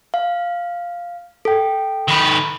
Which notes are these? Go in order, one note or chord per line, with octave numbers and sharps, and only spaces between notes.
F5
A4 G5
D#3 B4